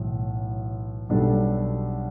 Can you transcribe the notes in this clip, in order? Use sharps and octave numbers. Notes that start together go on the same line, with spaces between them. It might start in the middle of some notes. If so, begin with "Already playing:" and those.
Already playing: B1 A2 E3
B1 B2 G3 D4 A4